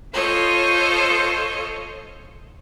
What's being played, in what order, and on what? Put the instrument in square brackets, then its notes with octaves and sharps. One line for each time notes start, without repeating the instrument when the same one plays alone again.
[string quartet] F4 A4 C5 C#5 D#5